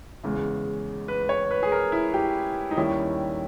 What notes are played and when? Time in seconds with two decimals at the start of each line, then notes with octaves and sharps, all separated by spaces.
0.23 E2 C#3 G#3
1.08 B4
1.29 C#5
1.51 B4
1.63 G#4
1.72 A#4
1.92 E4
2.14 G4
2.71 D#4
2.77 D#2 D#3 G3 C#4 E4